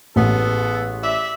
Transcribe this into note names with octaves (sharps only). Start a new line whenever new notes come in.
A1 G#3 B3 A4
D5 E5